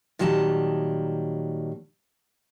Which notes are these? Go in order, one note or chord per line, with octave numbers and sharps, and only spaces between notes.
A#2 D#3 F#3 G3 A5